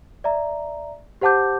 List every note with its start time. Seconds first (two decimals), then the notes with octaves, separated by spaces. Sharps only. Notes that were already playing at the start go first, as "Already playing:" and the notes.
0.24 D5 E5 A#5
1.21 G4 C5 F#5 A5 D6 G6